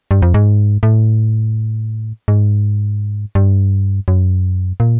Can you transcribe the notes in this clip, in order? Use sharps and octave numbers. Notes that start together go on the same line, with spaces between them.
G2
F2
G#2
A2
G#2
G2
F#2
A#2